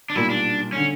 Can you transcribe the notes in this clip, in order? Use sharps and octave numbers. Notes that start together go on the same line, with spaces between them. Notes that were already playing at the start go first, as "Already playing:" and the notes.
D4
B1 A#2 G3 A#3 E4
D4
D3 C#4